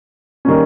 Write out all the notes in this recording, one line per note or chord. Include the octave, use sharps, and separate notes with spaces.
D#3 G3 A#3 C#4